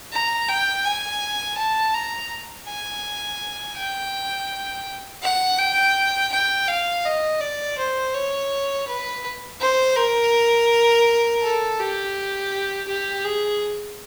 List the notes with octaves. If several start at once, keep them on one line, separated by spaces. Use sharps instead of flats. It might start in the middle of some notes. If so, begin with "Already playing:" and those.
A#5
G5
G#5
A5
A#5
G#5
G5
F#5
G5
G5
F5
D#5
D5
C5
C#5
B4
C5
A#4
A4
G4
G4
G#4